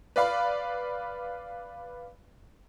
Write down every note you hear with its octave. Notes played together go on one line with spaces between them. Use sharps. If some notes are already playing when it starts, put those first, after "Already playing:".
B4 D5 F5 B5